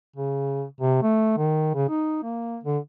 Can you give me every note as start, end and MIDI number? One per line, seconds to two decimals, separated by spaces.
0.16 0.64 49
0.80 1.00 48
1.03 1.32 57
1.38 1.73 51
1.75 1.89 49
1.89 2.21 63
2.23 2.58 58
2.64 2.78 50